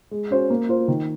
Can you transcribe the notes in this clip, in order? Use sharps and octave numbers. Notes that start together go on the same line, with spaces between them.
G#3
C#4 F#4 C5
A#3
F4 C5
D#3